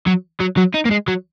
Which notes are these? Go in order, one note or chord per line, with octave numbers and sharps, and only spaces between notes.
F#3
F#3
F#3
D#4
A#3
G#3
F#3